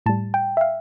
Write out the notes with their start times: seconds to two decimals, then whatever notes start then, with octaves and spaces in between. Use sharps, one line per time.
0.06 A2 G3 A5
0.34 G5
0.57 E5
0.61 F5